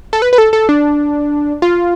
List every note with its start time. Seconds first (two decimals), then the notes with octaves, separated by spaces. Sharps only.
0.13 A4
0.22 B4
0.33 B4
0.38 A4
0.53 A4
0.69 D4
1.62 F4